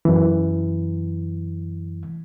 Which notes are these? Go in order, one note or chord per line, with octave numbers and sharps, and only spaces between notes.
F#2 E3